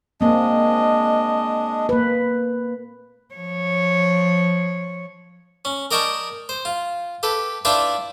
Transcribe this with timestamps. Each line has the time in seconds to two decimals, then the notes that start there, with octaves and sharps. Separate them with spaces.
0.21 G#3 A#3 C4 D4 D#5
1.89 A#3 B4
3.34 F3 C#5
5.65 C#4
5.91 A#4 D5 D#5 G5 A5 C#6
6.49 C5
6.65 F4
7.23 G4 A4 B4
7.65 D4 E4 F4 B4 G5 B5